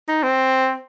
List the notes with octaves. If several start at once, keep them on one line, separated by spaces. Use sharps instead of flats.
D#4
C4